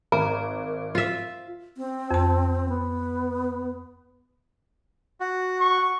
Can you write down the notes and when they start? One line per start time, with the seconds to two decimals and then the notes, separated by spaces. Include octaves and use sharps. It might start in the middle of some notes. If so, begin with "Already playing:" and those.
0.12 G#1 A#4 A#5
0.95 F4 E5
1.77 C4
2.11 F2 A5
2.69 B3
5.20 F#4
5.61 C#6